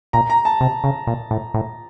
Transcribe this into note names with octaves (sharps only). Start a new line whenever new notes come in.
A#2 A#5
A#5
A5
C3
C#3
A#2
A2
A2